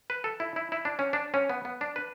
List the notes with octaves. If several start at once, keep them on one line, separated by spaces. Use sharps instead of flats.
B4
A4
E4
E4
E4
D4
C#4
D4
C#4
B3
B3
D4
B4